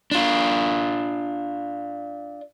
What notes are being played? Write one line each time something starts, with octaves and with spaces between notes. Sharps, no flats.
D4 F4